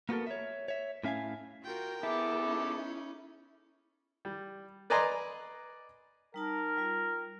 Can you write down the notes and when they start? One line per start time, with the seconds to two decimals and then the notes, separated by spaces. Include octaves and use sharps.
0.09 A#3 B3 F#4 G4 A4 A#4
0.27 C#5 E5
0.68 C#5 E5
1.04 A2 C#4 E5 F5 G#5
1.64 F4 F#4 A#4 G5
2.03 B3 E4 G#4 A4 A5 D6
2.44 C#4 D#4
4.25 G3
4.90 B4 D5 D#5 G#5 A#5 C6
6.34 G3 D#4 A#4 A5
6.77 G3 F4